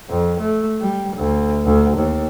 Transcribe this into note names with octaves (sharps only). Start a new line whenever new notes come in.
F2
A3
G3
D2
D2
D#2